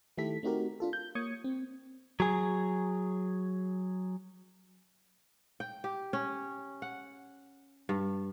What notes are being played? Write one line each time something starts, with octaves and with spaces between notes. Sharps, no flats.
D#3 A3 E4 G4 A4 B6
A3 C4 D#4 F#4 G4 A#4
D4 F4 A4
G6
A#3 C#5 D#6 G#6 C#7
C4
F#3 G#4
G5
G4
C#4
F#5
G2